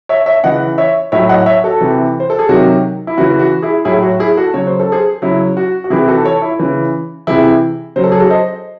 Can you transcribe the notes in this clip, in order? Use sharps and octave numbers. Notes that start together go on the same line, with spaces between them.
C#5 E5
C#5 E5
C#3 E3 D#5 F#5
C#5 E5
A2 F#3 C#5 E5
D#5 F#5
C#5 E5
F#4 A4
C3 E3
C5
A4
G#4
C3 D#3 F#3 F#4
E4
C#3 E3 F#4
F#4
E4 G#4
A2 F#3 E4 G#4
F#4
E4 G#4
F#4 A4
C#3 F#3 C#5
C5
A4
G#4 C5
C#3 F#3 E4
F#4
F#4
C3 E3 E4 G#4
F#4 A4
A4 C#5
E4
C#3 E3
C3 E3 E4 G#4
C#3 F#3 C5
A4
G#4
F#4 A4
C5 D#5